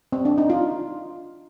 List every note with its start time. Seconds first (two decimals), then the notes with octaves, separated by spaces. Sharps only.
0.12 C4
0.25 D4
0.38 D#4
0.50 F4